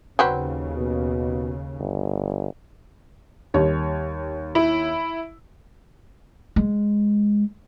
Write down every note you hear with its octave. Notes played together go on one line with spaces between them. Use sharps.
D#2 C#3 F#3 C4 B4
B2
G1
D#2 G3 C#5
E4
G#3